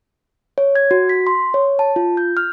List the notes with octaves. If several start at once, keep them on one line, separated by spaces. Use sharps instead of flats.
C#5
G#6
F#4
B6
C6
C#5
A5
F4
G6
F6